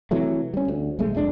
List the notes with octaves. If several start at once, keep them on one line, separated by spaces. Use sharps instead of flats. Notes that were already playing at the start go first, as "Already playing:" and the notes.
C3 E3 F#3 A3
G3 C#4
D2
D#1 B1 G#3 A3
F1 G#3 D4